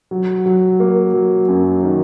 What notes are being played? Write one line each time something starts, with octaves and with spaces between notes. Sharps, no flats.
F#3
F#3
A#3
F#3
F#2
D#3